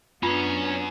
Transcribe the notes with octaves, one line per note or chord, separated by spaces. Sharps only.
F#2 B3 C#4 D4 F4